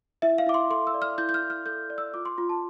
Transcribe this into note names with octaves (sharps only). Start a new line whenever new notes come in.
E4 E5
F5
E4 D6
C6
A4 C6
E6
D5
F6
E4 G6
G6
F6
E4
F6
A4 G6
D5
E6
F4 D6
C6
F4
A5